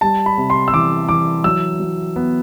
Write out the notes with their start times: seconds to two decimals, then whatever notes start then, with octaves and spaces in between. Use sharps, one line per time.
0.01 G3 A5
0.26 B5
0.38 C3
0.50 C6
0.68 E6
0.73 E3 D6
1.09 E3 D6
1.44 F#3 E6
1.79 F#3
2.16 B3